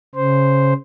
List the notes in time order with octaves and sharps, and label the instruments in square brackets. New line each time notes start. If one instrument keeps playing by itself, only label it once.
[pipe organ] C#3 C5